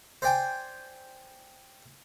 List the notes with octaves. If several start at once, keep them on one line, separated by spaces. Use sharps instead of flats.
C5 D5 G5 G#5